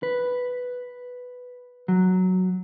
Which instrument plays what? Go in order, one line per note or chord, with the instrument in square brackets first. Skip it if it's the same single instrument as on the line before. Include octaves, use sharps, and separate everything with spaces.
[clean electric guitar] B4
F#3